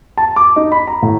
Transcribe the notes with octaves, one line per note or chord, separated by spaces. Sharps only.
A5
D6
D#4
B5
A#5
A2